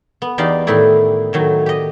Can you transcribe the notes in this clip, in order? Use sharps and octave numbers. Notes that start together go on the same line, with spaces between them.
B3
E2 D#4 G4 D5 F5
A2 D#3 D#4 E4 D5
A2 D#3 F#3
G4 D#5